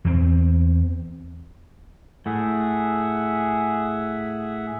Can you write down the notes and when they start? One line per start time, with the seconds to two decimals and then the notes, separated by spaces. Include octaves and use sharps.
0.05 E2 C4
2.26 A2 G#4 E5 F#5